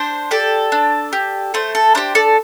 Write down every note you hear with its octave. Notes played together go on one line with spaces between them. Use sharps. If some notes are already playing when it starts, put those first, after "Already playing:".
Already playing: D4 C5
G4 A4 D5
D4
G4
A3 C5
A4
D4 G4 C5
A4 D5